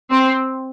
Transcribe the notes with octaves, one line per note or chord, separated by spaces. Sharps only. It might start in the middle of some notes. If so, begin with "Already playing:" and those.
C4